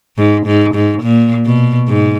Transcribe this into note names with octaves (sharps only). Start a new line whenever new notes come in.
G#2
G#2
G#2
A#2
B2
G#2